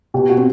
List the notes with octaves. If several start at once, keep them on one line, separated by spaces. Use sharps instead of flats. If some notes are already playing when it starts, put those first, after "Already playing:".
B2 G4
F#4
C4